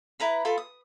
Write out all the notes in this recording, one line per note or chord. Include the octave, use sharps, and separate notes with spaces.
E4 B4 A#5 B5
F4 A4 B5
D#6